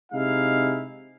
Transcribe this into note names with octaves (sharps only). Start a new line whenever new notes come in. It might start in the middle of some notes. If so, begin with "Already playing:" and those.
C3 G#3 D#4 E4 F5